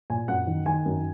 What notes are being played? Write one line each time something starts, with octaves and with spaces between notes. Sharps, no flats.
A#2 G#5
F#2 F#5
D#3
D#3 G#5
F#2